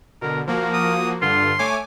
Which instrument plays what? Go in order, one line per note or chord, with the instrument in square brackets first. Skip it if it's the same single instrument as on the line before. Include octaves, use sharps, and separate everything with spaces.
[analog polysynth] B2 D3 [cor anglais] A#4
[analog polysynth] F3 A#3 F#4 [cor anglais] A#4
[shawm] D#6
[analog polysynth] G2 D3 [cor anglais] F4 [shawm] C6
[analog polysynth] A3 G#5 D6 [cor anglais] C#5